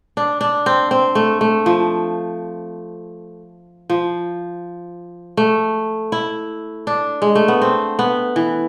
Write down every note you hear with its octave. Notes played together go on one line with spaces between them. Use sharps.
D4
D4
C4
C4
A3
A3
F3
F3
A3
E4
D4
G#3
A3
B3
C4
B3
E3